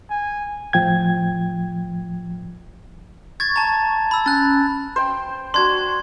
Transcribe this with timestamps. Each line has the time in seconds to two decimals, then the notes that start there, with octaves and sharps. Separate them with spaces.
0.10 G#5
0.73 A2 F3 G5 G#6
3.40 C#6 G#6 A6
3.56 A5 A#5
4.11 B5 E6
4.26 C#4 F#6 A6
4.96 C5 G5
5.54 D4 F#4 C6 G#6